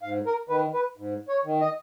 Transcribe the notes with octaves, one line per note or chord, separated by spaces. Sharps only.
G#2 F5
A#4
D#3 B4
B4
G#2
C#5
D#3
D#5